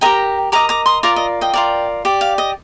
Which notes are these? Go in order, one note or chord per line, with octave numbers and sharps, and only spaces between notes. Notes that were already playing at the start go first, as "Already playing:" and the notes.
G4 A#4 D#5 G5 A#5
G4 A#4 D#5 A#5 D6
A#5 D6
C6 D#6
F4 A#4 D5 A#5 D6
D#5
D#5 G5
F4 A#4 D5
G4 D5
F5
D#5